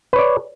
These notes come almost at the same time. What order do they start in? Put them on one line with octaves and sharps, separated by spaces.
B4 C#5 D5